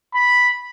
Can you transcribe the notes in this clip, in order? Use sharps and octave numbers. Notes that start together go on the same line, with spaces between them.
B5